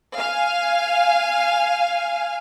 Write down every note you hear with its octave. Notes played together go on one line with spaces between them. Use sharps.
F5 G#5